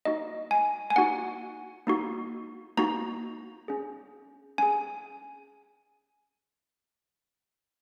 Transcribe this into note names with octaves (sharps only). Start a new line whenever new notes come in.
A#3 D#4 F#4 D#5
G#5
G#5
A#3 D#4 F#4 F#5
A#3 D#4 F#4
A#3 D#4 F#4 A#5
C#4 G#4
C#4 G#4 G#5